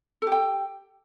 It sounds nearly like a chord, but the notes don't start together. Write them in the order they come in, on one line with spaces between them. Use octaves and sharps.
A4 G4 G5